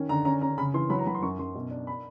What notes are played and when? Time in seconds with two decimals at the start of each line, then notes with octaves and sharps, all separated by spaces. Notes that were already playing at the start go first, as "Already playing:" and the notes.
Already playing: D#3 C#4
0.09 D3 A#5
0.25 C#4 A#5
0.41 C#4 A#5
0.58 C#3 B5
0.74 E3 C6
0.90 F#3 B5
0.99 A#5
1.07 F#3 B5
1.15 C6
1.22 F#2 C#6
1.39 F#2 C6
1.55 B2
1.71 D4
1.87 B5